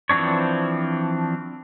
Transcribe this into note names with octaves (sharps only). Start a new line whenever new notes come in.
E3 F3 C4 D4 C#5